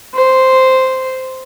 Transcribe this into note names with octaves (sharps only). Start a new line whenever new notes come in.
C5